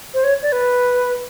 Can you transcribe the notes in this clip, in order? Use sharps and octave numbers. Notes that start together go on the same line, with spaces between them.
C5
C#5
D5
B4